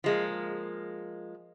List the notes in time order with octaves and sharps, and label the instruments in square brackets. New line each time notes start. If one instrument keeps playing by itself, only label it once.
[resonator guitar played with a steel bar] F3 G#3 A#3